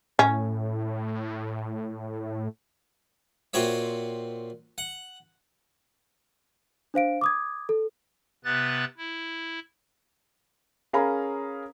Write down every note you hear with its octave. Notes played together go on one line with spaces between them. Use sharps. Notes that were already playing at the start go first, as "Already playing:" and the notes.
A2 C#4
A#2 C4 F#4 C#5 E5
F#5
D4 C5 F5 D7
D6 D#6 G#6
A4
C3 B3 B4 F#6 A6
E4
C#4 G#4 A#4 F5 A#5 B5